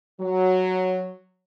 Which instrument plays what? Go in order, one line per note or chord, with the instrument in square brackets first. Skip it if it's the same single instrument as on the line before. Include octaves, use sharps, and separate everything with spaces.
[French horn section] F#3